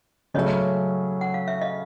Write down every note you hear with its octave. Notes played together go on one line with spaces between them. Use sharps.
C#3 F#3 A3 C#4 C#5 D#5
F#5
F5
E5
D#5 F5